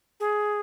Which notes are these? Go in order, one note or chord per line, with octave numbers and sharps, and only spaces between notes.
G#4